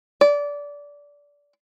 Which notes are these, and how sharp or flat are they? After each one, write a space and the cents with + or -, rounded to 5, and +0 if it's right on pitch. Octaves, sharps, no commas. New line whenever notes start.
D5 -20